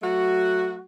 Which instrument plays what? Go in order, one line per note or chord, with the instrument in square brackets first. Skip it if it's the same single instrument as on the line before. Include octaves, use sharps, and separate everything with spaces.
[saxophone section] F#3 A3 F#4